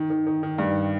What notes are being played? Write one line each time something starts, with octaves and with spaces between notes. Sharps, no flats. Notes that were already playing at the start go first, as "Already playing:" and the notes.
Already playing: D#3
D#3
D#3
D#3
G2